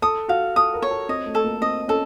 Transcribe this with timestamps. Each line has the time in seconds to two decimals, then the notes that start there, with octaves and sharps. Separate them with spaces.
0.02 A4 D#6
0.28 F#4 F5
0.56 A4 D#6
0.74 A#4
0.82 C#5
0.91 A4
1.09 C4 D#5
1.26 A3
1.35 A4
1.44 A#3
1.62 C4 D#5
1.88 C#4 A4